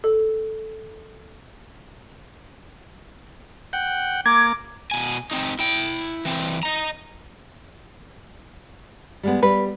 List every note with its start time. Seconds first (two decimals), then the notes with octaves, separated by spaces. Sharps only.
0.04 A4
3.73 F#5 G5
4.26 A#3 D6 G#6
4.91 B2 G#5
5.31 C4 D#4
5.59 E4 G5
6.25 E3 C4
6.63 D#5 A#5
9.23 G3 G#3 B3
9.43 G3 B4